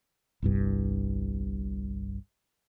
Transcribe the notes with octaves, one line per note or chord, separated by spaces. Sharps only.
G1 C2 G2